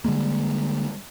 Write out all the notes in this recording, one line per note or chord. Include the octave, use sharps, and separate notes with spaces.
D3 G3 G#3 A#3